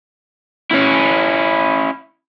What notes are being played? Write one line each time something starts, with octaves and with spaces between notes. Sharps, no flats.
C#4 E4